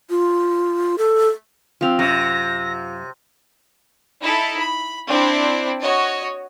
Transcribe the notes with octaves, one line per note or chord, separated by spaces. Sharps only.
F4
A4
F3 C4 F4 F5 F7
F#2 C3 A#6
D#4 E4 A4
B5
C4 D4 E4
F#4 C#5 D#5